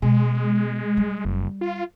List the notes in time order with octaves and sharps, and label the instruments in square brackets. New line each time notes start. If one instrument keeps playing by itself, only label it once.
[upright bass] B2 [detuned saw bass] G#3
[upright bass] G3
[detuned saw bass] F#1
F4